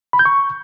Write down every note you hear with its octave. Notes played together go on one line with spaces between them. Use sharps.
B5
G6
C#6